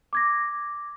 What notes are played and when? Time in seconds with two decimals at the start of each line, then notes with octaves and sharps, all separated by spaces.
0.13 D6 G#6 A#6